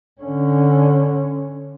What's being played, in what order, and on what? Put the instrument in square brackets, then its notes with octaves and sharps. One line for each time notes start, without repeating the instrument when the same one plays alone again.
[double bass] D3 C#4